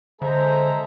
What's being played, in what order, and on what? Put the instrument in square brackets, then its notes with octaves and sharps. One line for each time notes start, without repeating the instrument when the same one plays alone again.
[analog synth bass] D3 [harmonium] G#3 A4 E5 [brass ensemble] G#4 A#5 [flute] C5